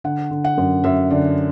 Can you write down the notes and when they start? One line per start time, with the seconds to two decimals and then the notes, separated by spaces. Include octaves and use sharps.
0.04 D3 F#5
0.31 D3
0.44 F#5
0.58 F#2
0.84 F#2 E5
1.10 D3 D5